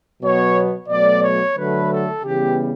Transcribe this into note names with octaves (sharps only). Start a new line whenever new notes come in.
B2 F#3 B3 C#5
B2 F#3 A3 D5
C#5
D3 F#3 A3 B4
A4
C#3 E3 G3 B3 G4